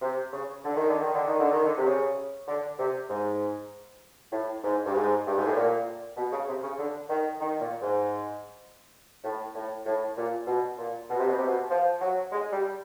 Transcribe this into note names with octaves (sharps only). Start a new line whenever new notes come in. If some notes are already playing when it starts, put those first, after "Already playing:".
C3
C#3
D3
D#3
D3
D#3
D3
D#3
D3
D#3
D3
C3
C#3
D3
C3
G#2
A2
G#2
G2
G#2
G2
G#2
A2
A#2
B2
C#3
C3
C#3
D3
D#3
D#3
A#2
G#2
A2
A2
A2
A#2
B2
A#2
B2
C3
B2
C3
B2
F3
F#3
G#3
G3